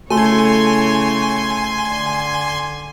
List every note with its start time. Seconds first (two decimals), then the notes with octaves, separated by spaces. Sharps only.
0.10 C#3 A3 E4 C#5 G#5 C6
1.84 D3